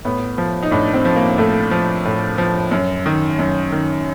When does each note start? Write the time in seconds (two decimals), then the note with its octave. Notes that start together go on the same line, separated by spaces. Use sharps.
0.05 A2 B3
0.38 F3
0.63 D#4
0.71 A2 D4
0.94 C4
1.05 F3
1.16 A#3
1.38 A2 A3
1.71 F3
2.05 A2
2.38 F3
2.71 F#2
3.06 D#3
3.39 F#2
3.72 D#3